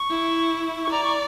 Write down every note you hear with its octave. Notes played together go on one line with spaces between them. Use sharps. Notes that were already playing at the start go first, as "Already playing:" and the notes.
Already playing: C#6
E4
C#6
D5 A#5
C#6